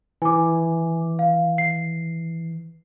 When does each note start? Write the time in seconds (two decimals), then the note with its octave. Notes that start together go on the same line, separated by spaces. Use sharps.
0.22 E3 G#5 D6
1.19 F5
1.58 C7